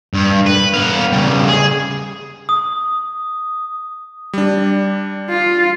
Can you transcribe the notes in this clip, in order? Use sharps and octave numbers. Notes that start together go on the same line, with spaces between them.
G2
B4
B3 F5
C#3 G3
G#4
D#6
G3 D4
F4